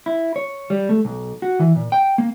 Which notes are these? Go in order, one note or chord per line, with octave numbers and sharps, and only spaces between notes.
E4
C#5
G3
A3
B1
F#4
E3
A#2
G5
A#3